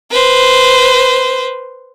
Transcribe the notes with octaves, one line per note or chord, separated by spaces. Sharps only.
B4 C5